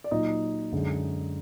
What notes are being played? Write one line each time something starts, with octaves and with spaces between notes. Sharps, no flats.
D5
A#2 F#3 D#4 D#5
F#2 D3 G#3